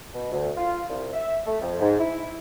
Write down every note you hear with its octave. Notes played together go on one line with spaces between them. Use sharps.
B2
D2
F4
C2
E5
A3
F2
G#2
E4